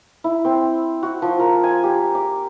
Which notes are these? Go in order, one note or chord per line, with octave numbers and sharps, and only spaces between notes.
E4
C4
F#4
F3
A#4
G#5
G4
D6